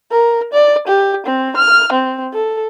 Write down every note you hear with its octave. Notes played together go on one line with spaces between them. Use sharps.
A#4
D5
G4
C4
F6
C4
A4